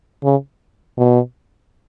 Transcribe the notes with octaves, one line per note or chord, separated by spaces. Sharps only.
C#3
B2